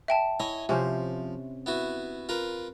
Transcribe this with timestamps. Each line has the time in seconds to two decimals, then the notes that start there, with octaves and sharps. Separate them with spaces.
0.08 E5 G5 A5
0.40 E4 C#5 D#5 G#5
0.69 C3 F3 C#4 C5
1.66 B3 E4 F#4
2.29 F4 A#4 B4